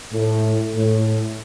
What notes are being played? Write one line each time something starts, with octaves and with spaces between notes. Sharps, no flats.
A2
A2